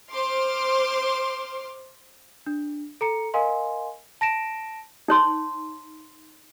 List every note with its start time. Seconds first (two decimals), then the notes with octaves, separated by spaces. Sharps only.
0.11 C5 C6 D6 F6
2.46 D4
3.01 A4 A#5 C#7
3.34 A#4 D#5 F5 G#5 C6
4.21 A5 A#6 D7 E7
5.08 D#4 C#5 C6